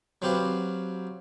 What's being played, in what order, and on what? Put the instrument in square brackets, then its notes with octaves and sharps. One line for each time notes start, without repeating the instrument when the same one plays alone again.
[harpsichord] F#3 C4 F#4 G4 B4 F5